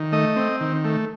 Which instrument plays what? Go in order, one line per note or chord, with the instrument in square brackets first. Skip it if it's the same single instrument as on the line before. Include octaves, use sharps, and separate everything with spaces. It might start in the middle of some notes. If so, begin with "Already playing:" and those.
Already playing: [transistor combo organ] D#3
A3 D#5
C4
D#3
A3